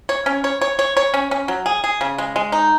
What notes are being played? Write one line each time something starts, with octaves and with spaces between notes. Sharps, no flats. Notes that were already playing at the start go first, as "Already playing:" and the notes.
C#5
C#4
C#5
C#5
C#5
C#5
C#4
C#4
F#3
G#4
G#4
C#3
G#3
G#3
D#4